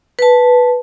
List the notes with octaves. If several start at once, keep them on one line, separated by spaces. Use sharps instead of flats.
B4 A5